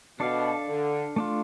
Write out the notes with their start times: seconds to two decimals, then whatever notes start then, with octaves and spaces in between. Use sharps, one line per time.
0.19 B2 D4 A4 D5 F5
0.68 D3
1.16 A3 D4 F4